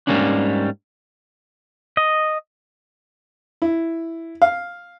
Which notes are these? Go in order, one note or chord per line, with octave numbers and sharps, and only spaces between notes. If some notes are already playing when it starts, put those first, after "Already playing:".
G#2 G3 G#3 A#3 C#4 D4
D#5
E4
F5